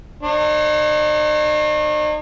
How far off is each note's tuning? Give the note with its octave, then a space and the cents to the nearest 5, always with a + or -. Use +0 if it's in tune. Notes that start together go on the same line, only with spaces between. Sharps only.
D#4 -45 C#5 -35